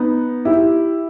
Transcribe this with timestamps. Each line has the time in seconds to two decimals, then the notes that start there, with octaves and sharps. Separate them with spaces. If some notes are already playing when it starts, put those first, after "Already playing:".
Already playing: B3 D#4
0.45 E4 G4